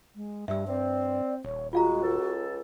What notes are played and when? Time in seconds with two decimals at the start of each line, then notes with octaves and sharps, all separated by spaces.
0.16 G#3
0.48 G2 G3 E5 E6
0.67 C4 D5
1.45 D#1 C#5
1.73 G#3 F4 F#4 F5 A#5
2.02 C#2 A4